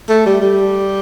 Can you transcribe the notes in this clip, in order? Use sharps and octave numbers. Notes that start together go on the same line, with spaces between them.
A3
G3
G3